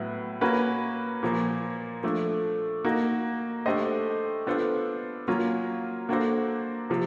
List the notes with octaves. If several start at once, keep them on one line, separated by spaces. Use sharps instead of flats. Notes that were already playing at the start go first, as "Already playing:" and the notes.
Already playing: A2 F#3 B3 E4
A#3 C#4 F#4 B4
A#2 F3 A#3
F3 A3 D4
A#3 D#4 F#4
A3 D4 G4 C5 D#5
B3 D4 F4 A4 C5
F#3 A#3 C#4 F4
A#3 D4 F#4 A4 C5
C3 F3